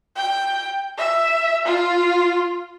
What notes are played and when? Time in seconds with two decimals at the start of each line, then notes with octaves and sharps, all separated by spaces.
0.16 G5
0.98 E5
1.65 F4